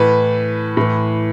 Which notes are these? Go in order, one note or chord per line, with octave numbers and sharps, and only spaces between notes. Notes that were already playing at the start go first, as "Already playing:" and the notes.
Already playing: A2 E3 B4
A2 E3